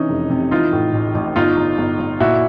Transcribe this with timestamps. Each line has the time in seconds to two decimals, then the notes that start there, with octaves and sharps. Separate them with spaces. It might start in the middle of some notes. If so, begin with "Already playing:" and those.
Already playing: C3 E3 C#4 D#4
0.09 F1
0.30 C3
0.51 E3 D#4 F4
0.72 A2
0.93 A1
1.15 A1
1.36 G1 D#4 F4
1.57 G1
1.78 G1
1.99 G1
2.20 A#2 E4 F#4